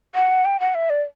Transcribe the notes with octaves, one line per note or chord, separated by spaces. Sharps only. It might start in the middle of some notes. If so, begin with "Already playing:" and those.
F#5
G5
F#5
E5
D5